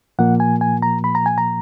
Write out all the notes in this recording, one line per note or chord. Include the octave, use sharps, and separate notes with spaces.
A#2 F3 A#3 F#5
G#5
G#5
A#5
B5
A#5
G#5
A#5